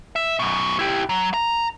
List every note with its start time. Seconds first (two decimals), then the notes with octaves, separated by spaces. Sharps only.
0.16 E5
0.39 F#2 B2
0.79 E4 G4
1.09 F#3
1.34 A#5